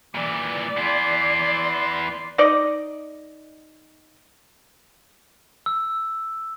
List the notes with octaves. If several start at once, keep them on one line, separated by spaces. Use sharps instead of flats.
A#2 E3 D5
E3 B3 C6
D#4 D5 D#5
E6